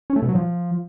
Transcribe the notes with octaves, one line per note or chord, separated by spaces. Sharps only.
C#4
A3
B2
F#3
F3